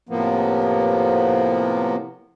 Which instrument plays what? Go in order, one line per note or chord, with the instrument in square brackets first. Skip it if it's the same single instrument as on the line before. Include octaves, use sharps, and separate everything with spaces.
[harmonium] A2 C3 F3 A#3 B3